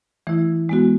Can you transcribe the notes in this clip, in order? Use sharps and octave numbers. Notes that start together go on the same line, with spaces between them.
E3 A3 E4
G#3 B3 F#4